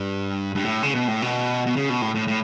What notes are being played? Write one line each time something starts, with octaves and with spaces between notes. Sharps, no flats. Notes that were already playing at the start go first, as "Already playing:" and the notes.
Already playing: G2
G2
A2
C#3
B2
A2
B2
B2
C#3
B2
A2
A2
A2